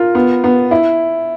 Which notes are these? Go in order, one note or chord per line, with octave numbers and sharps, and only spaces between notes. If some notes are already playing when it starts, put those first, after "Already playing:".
Already playing: F4 A#4
B3
B3
E4